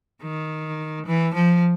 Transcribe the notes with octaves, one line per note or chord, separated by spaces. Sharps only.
D#3
E3
F3